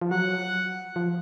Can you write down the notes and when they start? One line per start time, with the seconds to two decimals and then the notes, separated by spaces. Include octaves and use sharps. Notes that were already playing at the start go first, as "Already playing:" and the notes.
0.02 F3
0.11 F#3 F#5
0.96 F3